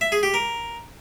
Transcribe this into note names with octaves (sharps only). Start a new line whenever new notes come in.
E5
G#4
G4
A#4